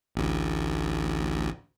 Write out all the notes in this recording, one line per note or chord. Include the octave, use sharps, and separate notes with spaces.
A1 D2